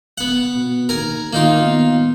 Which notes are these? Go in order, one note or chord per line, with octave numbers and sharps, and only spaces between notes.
B3 F#5
B2
D#2 A#4 G#5 A#5
D#3 A#3 D#4 F4
B3